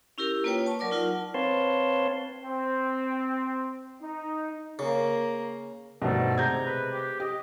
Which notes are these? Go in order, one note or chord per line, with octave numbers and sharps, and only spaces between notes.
C#4 E4 G4 A#4
A#3 F4 B4 C#5 G5
A5 C#6
F#3 A#4 D5 D6
D#4 F4 A#4 F#5 A5
C4 B4 C#5 F5 A5 C6
C4
D#4
C#3 A#3
G2 B2 D#3 A3 C4 A4
C3 G#3 A#5 G6 G#6
B4
G4
G4 D#5